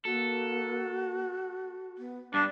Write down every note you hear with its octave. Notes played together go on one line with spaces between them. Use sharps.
A#3 F#4 A4
B3
G2 D4 D5